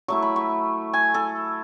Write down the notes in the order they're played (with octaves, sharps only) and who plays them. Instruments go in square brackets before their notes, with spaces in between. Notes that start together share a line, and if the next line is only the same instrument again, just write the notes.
[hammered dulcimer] F#3 A3 E4 C#6
B5
C#6
G#5
A4